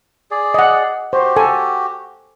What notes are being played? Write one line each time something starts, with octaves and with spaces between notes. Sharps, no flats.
G#4 D5
D#5 F#5
F#4 G4 C5
A4 G#5